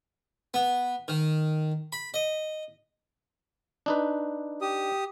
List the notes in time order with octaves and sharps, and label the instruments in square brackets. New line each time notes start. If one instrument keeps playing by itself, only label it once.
[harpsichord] B3
D#3
B5
D#5
[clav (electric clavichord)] D4 D#4 B4
[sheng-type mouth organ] G4 D#6